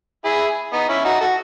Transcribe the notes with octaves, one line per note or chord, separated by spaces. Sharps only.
E4 G#4
B3 D#4
C#4 E4
D#4 F#4
F#4 A4